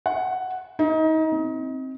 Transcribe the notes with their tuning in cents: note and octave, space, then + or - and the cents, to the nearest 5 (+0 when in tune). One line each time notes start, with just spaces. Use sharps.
F#5 +5
D#4 +30
C4 +10